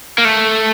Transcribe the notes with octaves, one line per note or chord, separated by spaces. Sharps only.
A#3
A3